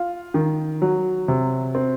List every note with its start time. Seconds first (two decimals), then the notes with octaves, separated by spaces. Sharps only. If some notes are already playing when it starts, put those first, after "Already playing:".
Already playing: F4
0.34 D#3
0.82 F#3
1.28 C3
1.75 C4